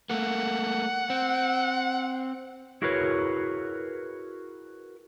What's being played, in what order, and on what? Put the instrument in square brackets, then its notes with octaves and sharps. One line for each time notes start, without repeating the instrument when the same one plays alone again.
[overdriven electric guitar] A3 A#3 [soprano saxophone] F#5
[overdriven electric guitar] C4
[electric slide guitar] E4 F#4 G#4 A#4 B4 C#5